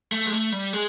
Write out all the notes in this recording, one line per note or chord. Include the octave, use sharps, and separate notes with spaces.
A3
G#3
A3
G3
G#3